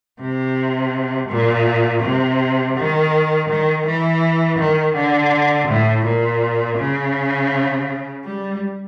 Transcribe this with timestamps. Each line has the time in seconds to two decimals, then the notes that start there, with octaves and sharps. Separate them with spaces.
0.20 C3
1.30 A#2
2.03 C3
2.76 D#3
3.49 D#3
3.86 E3
4.58 D#3
4.95 D3
5.68 A2
6.05 A#2
6.78 C#3
8.24 G3